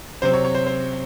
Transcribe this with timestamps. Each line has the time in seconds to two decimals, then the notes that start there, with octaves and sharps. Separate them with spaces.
0.22 C3 F#3 C4 C5
0.34 C#5
0.45 C#5
0.55 C5
0.67 C5